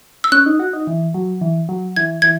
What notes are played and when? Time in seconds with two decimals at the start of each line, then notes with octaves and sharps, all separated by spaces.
0.24 E6
0.32 C#4 F#6
0.46 D#4
0.59 F#4
0.73 D#4
0.87 E3
1.14 F#3
1.41 E3
1.69 F#3
1.96 E3 G#6
2.22 E3 G#6